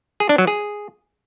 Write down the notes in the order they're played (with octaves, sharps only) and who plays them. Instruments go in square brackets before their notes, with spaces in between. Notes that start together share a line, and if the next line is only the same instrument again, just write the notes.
[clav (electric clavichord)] G#4
D4
F#3
G#4